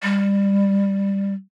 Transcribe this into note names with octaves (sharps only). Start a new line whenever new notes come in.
G3